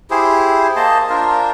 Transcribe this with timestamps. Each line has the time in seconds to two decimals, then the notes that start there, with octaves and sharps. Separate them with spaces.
0.10 E4 G4 G#4 C5
0.76 A#3 C5 D#5 A5
1.10 D4 F4 A#4 C5